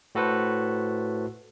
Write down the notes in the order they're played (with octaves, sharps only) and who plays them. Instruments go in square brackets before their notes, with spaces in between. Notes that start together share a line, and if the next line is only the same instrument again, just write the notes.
[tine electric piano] A2 F#4 A4 B4 C5